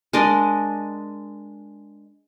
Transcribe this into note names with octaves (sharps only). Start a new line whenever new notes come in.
G#3 D4 A#4 D#5